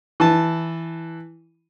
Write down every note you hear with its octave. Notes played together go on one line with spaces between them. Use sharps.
E3 A5